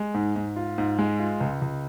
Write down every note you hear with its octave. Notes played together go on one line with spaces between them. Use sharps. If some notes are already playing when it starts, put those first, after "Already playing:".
Already playing: G#3
G#2
G#2
F4
G#2
G#3
F4
C#2
C#2